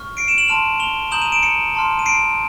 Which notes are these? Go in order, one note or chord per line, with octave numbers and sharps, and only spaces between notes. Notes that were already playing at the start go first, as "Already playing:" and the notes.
Already playing: C#6 F6
C7 D7
D7 E7
E7 F#7
A5 C6 F6 D#7 F7
F7 G7
A#5 D#6 G6 E7 F#7
D#7 F7
D7 E7
C#7 D#7
A5 C6 F6
D#7
C7 D7